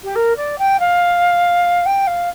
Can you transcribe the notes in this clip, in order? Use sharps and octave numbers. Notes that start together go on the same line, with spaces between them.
G4
A#4
D5
G5
F5
G5
F5